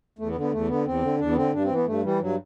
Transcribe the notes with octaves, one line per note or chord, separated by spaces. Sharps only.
E2 A3
B3
D3
B3
E2 A3
D3 B3
E2 C4
D3
E2 D4
B3
D3 C4
G2 D4
C4
E3
B3
G2 A3
E3 G3
G2 F#3